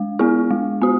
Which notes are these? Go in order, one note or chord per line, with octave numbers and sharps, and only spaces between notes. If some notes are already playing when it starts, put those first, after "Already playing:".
Already playing: G#3
B3 E4 G#4
G#3
B3 F#4